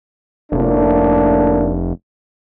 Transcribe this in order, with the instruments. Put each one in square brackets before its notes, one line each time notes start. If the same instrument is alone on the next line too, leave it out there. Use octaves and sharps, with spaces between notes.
[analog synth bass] F1 [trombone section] A2 A#3 D4